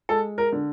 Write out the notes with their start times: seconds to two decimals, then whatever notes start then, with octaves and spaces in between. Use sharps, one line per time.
0.09 G#3 A4
0.38 A#4
0.52 D3